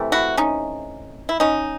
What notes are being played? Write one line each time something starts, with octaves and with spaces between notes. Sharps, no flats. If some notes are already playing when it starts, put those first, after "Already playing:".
Already playing: C3 E3 A3
E4 F#4
C#4 D#4
E4
C#4 D#4